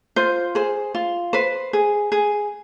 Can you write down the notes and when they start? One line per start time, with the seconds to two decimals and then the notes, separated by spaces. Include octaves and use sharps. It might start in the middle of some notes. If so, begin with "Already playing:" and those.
0.16 F4 C5
0.55 G#4 C5
0.95 F4
1.33 B4 C5
1.73 G#4
2.12 G#4